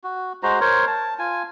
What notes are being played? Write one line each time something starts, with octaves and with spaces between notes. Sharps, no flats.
F#4
G#3 F#4 C5 A#5
A#4 C5 C#5
A5
F4 G#5